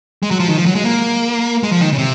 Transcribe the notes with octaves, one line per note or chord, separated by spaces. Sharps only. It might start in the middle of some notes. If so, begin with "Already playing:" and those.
G#3
F#3
F3
D#3
F3
F#3
G#3
A#3
G#3
F3
D#3
C#3
C3